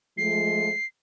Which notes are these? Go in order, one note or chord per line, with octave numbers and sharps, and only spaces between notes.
F3 G#3 A3 C7